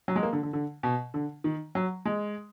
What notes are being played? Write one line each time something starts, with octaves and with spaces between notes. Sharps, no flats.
F#3
G#3
A#3
D3
D3
D3
B2
D3
D#3
F#3
G#3